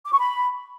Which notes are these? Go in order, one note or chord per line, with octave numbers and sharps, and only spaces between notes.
D6
C#6
B5